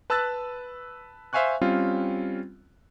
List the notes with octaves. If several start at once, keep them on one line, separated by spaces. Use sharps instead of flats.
B4 A5 B5 E6 F#6 A6
C5 E5 F5 G#5 C#6 F#6
G3 C4 C#4 F4